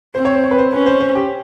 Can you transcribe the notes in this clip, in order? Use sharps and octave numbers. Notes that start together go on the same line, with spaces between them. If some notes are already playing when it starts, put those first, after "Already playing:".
C4 C5
C#5
C5
C#5
B4
C5
C#4 B4
C5
C5
G4